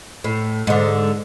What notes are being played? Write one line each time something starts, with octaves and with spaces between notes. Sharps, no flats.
A2
G#2 D3